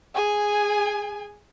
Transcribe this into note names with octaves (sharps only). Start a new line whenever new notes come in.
G#4 G#5